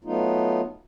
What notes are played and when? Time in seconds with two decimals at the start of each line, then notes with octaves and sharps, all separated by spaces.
0.05 F#3 A3 B3 D#4 F4